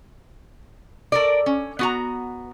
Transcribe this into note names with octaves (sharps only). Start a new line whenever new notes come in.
A4 A#4 D5
C#4
B3 F#4 A#5